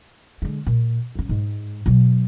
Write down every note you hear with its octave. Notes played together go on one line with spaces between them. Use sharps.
D3 G#3
A#2
G1 C#4
G#2 G#3
B2 F#3